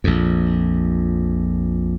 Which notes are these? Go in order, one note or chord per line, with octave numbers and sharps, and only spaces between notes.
A#1 F2